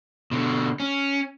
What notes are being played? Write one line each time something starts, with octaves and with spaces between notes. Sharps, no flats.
B2 D3
C#4